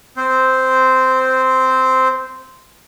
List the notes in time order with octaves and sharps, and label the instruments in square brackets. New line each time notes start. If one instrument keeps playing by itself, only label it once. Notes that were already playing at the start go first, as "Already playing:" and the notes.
[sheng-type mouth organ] C4 C5